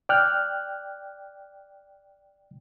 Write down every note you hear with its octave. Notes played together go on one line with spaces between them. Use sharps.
D5 G5 F6 F#6